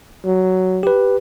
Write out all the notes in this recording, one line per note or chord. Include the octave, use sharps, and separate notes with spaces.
F#3
G4 B4